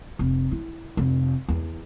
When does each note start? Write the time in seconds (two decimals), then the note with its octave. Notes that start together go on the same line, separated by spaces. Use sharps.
0.19 F1
0.52 E4
0.97 F1
1.48 E2